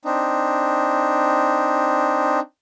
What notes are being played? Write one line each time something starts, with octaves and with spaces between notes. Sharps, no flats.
C4 D4 D#4